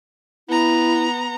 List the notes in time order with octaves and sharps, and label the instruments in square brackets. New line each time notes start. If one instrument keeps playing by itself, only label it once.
[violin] B3 A#5 [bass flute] E4